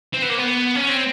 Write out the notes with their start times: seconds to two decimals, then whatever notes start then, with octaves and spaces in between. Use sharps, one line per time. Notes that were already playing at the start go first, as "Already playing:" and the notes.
0.13 C4
0.22 B3
0.29 A#3
0.38 B3
0.75 C#4
0.89 C4